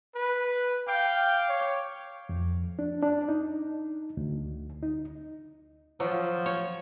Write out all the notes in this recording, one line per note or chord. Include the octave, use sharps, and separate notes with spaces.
B4
F5 G5 D6 F6
C#5
F2
D4
D4
D#4
D2
D#4
F3 F#3
C#5